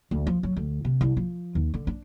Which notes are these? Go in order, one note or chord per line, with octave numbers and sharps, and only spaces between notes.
D2
F3
F#3
D2
C3
C2
F3
D#2
D3
D4